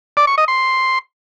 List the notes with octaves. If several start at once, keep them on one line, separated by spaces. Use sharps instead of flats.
D5
C#6
D#5
C6